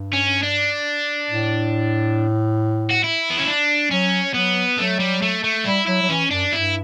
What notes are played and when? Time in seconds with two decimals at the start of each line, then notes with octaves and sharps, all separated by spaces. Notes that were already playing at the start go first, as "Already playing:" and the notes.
Already playing: G2
0.13 C#4
0.43 D4
1.30 A2
2.91 F#4
3.04 E4
3.30 B3
3.39 C#4
3.48 D4
3.91 F#3 C#4
4.34 F#3 B3
4.78 F#3 A3
5.00 G3
5.22 A3
5.44 A3
5.65 G3 E4
5.87 F#3 E4
6.02 F#3
6.09 E3 C#4
6.31 F#2 D4
6.52 G2 E4